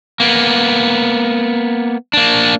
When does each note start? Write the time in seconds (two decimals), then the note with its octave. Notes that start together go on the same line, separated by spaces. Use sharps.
0.20 A#3 B3
2.13 A#3 D4